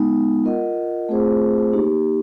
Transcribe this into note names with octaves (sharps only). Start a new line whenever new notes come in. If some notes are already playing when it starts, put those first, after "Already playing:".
Already playing: G#3 B3 D#4
F4 A#4 D#5 F#5
A3 C4 F4 G#4 C5
A#3 D#4 G4